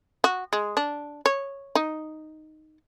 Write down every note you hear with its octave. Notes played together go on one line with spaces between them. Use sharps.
F#4
G#3
D4
C#5
D#4